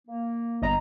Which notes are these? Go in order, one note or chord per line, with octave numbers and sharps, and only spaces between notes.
A#3
G1 D#5 A#5